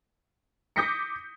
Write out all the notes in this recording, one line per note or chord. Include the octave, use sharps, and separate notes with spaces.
D6 D#6 G6 A#6 B6 C#7